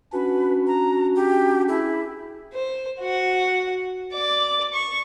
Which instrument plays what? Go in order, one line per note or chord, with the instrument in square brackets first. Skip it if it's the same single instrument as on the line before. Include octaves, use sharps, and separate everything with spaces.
[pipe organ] C#4 D4 [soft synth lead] F#4 [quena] B4
[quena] A#5
G4
[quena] E4 [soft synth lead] G#4
[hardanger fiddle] C5
F#4 F#5
D5 D6
C#6